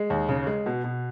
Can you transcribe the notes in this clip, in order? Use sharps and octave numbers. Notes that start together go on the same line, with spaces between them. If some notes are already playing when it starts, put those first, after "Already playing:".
Already playing: G#3
D#2
C#3
G#3
B2
B2